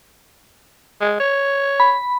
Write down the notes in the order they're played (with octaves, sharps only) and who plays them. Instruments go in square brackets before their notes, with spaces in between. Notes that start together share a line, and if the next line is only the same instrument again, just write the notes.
[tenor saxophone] G#3
C#5
[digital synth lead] B5